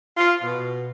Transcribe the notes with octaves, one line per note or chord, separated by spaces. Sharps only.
F4
B2